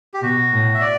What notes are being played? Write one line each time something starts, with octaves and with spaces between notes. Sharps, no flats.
G4
B2 F#4
A2
E5
D5